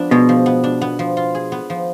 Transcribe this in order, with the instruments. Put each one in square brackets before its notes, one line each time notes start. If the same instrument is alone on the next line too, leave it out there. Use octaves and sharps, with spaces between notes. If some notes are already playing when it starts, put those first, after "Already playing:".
Already playing: [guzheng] F3 B3 D4
[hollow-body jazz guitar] B2 [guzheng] G#3
[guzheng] F3
B3
D4
B3
F3
F4
G#4
B3
F3